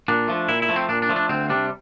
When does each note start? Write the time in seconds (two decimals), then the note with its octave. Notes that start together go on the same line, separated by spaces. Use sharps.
0.08 A#2 D4
0.28 F3 A3
0.49 A#2 E4
0.62 E4
0.69 F3 A3
0.76 C4
0.89 A#2 D4
1.02 D4
1.09 F3 A3
1.16 D4
1.29 D2 C4
1.49 C3 G3 D4